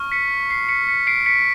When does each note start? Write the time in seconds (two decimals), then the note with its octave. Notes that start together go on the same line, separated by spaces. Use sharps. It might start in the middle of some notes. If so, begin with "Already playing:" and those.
Already playing: C#6 F6
0.12 B6 C#7
0.50 C7
0.69 B6 C#7
0.88 B6 C#7
1.07 C7 D7
1.26 B6 C#7